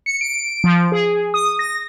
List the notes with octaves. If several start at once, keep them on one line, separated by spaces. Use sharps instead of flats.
C#7
D7
F3
G#4
D#6
A#6